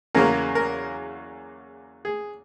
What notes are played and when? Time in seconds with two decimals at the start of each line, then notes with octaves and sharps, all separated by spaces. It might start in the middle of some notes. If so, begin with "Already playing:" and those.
0.15 E2 C#3 F#3 A#3 A#4
0.55 A#4
2.05 G#4